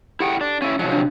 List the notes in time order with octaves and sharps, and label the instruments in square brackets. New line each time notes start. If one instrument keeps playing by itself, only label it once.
[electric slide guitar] E4 F#5 G5 [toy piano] G4 A4
[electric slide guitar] D4
[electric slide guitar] C#4 E4 [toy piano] F5
[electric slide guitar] C3 F3 F#3 [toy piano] D#4 D#5 G#5
[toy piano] D4 E4 F5